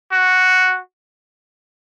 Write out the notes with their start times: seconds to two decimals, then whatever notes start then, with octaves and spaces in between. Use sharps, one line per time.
0.12 F#4